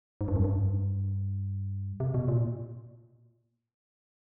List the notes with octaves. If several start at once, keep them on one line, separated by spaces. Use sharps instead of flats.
G#2
G2
F#2
G2
C3
B2
A#2